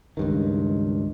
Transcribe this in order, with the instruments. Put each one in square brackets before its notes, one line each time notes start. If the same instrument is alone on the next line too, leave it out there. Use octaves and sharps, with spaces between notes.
[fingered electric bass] C#2 G2 D#3